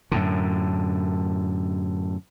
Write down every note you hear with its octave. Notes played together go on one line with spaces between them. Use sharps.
F#2 A2 D3